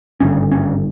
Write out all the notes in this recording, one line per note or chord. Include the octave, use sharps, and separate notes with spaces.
G#1 G2 D3 C#4
C#4